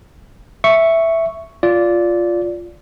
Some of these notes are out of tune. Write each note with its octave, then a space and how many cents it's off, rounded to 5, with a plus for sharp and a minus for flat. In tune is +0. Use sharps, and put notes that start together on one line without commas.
E5 +0 C#6 +0
F4 +0 D5 -15